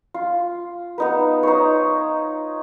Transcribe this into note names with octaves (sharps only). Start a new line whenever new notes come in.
F4
B3 D#4 B4
D#4 C5 C#5